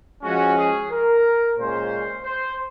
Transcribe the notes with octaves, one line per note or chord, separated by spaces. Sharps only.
F3 G#3 C#4 F#4
G#4
A#4
A#2 G#3 C#4 C5
C5